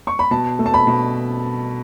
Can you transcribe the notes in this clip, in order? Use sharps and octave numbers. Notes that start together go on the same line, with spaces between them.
C#6
B5
B2 A5
A3
A5
B5
B2